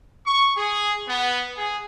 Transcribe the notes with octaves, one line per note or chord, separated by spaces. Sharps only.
C#6
G#4
B3
G#4